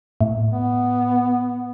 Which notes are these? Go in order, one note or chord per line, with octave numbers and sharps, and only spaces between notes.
A2
B3